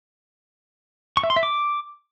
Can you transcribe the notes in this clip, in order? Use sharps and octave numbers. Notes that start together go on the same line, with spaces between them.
C#6
E5
C6
E5
D6